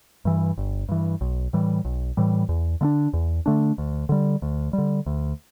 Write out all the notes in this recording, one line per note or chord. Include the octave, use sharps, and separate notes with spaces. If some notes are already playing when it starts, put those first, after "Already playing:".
G2 E3
G1
G2 E3
B1
A2 E3 G3
B1
A2 E3 G3
E2
D3 A3 D4
E2
D3 A3 D4
D2
D3 G3
D2
G3
D3
D2